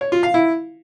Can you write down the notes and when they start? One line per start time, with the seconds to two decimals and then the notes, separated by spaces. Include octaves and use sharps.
0.01 C#5
0.12 F4
0.23 F5
0.34 E4